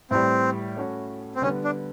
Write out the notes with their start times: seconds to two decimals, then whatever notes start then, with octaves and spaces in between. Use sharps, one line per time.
0.11 A2 E3 G3 C4
0.77 A3 C#4 F#4
1.35 C4
1.42 D3 G3 B3 C#4
1.64 D4